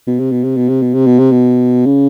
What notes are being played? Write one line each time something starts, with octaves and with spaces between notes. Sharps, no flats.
B2
C3
B2
C3
B2
C3
B2
C3
B2
C3
B2
C#3